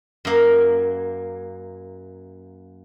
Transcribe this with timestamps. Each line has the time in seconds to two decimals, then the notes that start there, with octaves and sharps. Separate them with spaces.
0.25 F#2 A#3